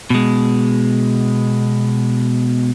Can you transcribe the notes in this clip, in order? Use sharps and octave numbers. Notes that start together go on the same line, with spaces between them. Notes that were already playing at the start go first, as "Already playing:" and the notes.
B2 G#3